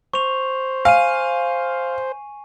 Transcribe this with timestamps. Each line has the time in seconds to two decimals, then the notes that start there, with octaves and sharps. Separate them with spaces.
0.13 C5 C#6 F7
0.85 F5 G#5 D#7